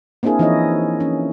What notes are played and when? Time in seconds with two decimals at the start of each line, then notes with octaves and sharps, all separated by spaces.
0.23 A#3 C4 D4 E4 G#4 A#4
0.39 E3 F3 D#4 E4 C#5 D#5
1.00 C#4